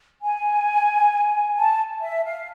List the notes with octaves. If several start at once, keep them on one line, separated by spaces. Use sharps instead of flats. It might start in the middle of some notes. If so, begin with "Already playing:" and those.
G#5
A5
E5
F5